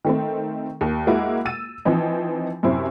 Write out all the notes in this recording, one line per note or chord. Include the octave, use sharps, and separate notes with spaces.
D#3 A3 C4
D#2
G#3 A#3 E4 F#4
E6 A6 D#7
E3 F3 C4 D#4
F#2 C3 E4 C5